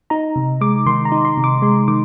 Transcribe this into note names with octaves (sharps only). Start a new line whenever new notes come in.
D#4 A#5
C3
G#3 D6
D#3 C6
A#5
D#4
C6
C3
D6
G#3 C6
D#3 D6